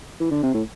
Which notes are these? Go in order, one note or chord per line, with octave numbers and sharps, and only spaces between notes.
E3
D3
C3
A2